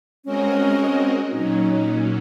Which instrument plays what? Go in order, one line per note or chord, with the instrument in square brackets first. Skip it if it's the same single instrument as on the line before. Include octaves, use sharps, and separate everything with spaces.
[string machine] G#3 C4 F#4 A#4 D#5 [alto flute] C#4
[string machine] A#2 F#3 C#4 [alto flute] D#4